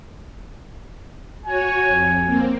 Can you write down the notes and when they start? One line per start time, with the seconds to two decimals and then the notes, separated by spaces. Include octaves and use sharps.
1.45 F#4 C#5 G#5
1.87 F2
2.26 A#3 C4